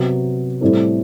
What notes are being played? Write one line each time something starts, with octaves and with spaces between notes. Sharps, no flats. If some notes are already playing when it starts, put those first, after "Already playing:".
Already playing: C3 F#3 B3
A2 G3 C4 E4 A4